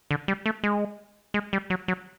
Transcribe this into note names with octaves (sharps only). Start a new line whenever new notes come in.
D3
G3
A3
G#3
G#3
G3
F#3
F#3